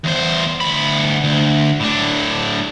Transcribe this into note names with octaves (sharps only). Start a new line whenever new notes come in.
E2 C5
D2 B5
D2
A2 D4